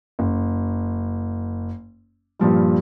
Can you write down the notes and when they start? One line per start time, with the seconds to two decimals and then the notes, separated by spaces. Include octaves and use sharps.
0.19 F#1
2.39 G2 A#2 F3 G3